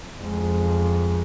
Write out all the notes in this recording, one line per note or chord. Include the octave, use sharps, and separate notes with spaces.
F2 G#3